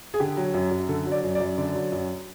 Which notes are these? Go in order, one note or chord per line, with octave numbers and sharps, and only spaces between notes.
G#4
D3 G4
F#3
F#2
F#2
D3 A4
F#3
D5
F#2
D5
F#2
D3 D5
F#3
F#2